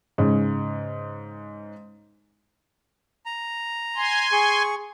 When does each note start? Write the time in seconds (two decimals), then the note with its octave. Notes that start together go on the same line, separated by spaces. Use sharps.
0.18 G#2 C#3
3.26 A#5
3.96 G#5 C6
4.32 G#4 C#6